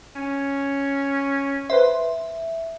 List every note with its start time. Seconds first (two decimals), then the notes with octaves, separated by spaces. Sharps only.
0.16 C#4
1.70 B4 C5 E5 C6